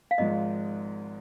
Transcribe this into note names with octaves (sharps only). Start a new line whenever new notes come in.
F5
G#1 G#2 F3 G#3 D#5